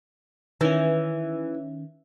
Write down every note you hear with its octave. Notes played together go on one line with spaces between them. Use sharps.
D#3 E3 C#4